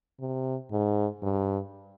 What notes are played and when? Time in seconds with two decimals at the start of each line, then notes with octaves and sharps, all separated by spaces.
0.20 C3
0.71 G#2
1.23 G2